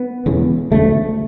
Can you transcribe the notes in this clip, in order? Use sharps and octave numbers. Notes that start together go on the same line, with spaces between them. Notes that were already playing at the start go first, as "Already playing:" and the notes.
Already playing: B3
E1 E2 C#3
E1 D2 C#3 A3